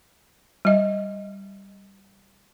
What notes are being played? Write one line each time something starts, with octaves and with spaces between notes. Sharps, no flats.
G3 D#5